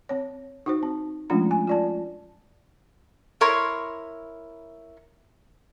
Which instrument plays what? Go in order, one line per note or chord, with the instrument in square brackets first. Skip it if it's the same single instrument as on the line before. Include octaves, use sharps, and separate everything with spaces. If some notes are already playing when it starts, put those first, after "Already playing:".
[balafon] C4 C#5
D#4 F#4 C5
C4
F3 G#3 A3 C#4 D4 F4
G#5
F4 D5 A5
[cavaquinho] E4 A#4 C#5 C6